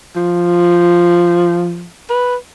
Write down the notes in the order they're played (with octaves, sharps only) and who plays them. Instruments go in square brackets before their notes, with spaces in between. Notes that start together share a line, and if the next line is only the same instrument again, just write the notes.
[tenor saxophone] F3
B4